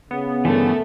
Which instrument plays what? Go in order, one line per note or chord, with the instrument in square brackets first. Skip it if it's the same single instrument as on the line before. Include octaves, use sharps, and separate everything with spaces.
[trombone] C#3 [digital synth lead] B3
[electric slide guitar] G2 D3 E3 [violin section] A3 A#4